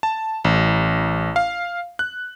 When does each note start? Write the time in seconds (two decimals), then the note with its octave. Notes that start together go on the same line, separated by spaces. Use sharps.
0.03 A5
0.44 A1
1.36 F5
1.99 F#6